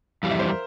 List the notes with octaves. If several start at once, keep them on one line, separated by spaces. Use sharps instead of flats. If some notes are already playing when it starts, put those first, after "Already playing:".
F2 E3 G3 F5
E5
C5
A#4